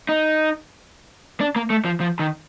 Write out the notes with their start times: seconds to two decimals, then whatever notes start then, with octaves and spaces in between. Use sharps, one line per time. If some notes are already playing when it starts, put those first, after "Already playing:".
0.09 D#4
1.41 D4
1.56 A#3
1.70 A3
1.85 F3
2.00 F3
2.19 D#3